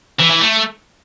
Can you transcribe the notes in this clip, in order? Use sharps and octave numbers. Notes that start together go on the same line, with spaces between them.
E3
E3
A3